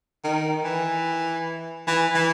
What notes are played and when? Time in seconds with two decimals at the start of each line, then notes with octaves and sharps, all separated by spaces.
0.24 D#3
0.64 E3
1.87 E3
2.15 E3